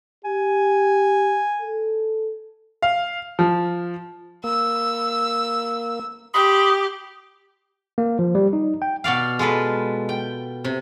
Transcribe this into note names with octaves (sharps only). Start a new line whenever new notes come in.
G4 G#5
A4
F5
F3
A#3 E6
G4 B5 C6 D#6
A#3
F3
G3
D#4
G5
B2 F#4 D5 F5
G#3 F4 A4 B4
G5
C3